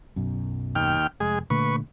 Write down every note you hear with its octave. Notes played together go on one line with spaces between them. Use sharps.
B1 F#2
D#2 G5 F6
F1 G#3 G#4
A#2 D3 A3 B4 C#6